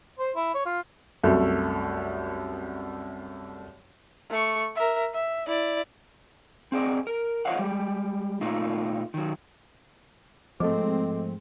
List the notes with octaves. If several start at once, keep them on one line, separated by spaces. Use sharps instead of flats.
C5
E4
C#5
F4
C2 F#2 A3
A3 C#6
A#4 E5
E5
E4 D5
C4 G#4 D5 D#5
A#4
F4 C5 C#5 D#5 F5 F#5
G3 G#3 G4
A#2 A3 D#4 F4
D#3 F#3
G#2 F3 G#3 A3 C4 A4 D#5 D6